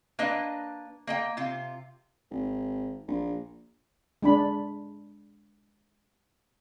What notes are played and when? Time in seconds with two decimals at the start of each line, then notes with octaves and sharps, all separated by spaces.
0.19 A#3 D4 B4 D#5
1.07 A#3 D#5 G5
1.37 C3 F4
2.31 G#1
3.08 A#1
4.23 G#3 D4 B5